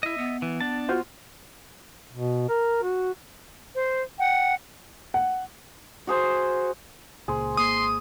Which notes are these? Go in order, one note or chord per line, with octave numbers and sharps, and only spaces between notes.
E4 D#5 E5
B3
E3
D4 A5
F4 F#4 C5
B2
A#4
F#4
C5
F#5 G5
F#5
F#4 G#4 C5
C#2 A#2 G#4 C5
G#1 A#3 C6 D#6